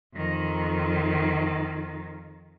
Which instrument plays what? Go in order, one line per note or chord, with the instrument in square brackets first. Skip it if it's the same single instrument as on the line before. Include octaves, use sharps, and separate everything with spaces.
[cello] F2 D#3